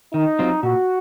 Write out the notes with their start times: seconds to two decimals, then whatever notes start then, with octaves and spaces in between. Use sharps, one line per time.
0.14 D#3 D#4
0.39 F#3 C4 F4
0.63 A#2 F#4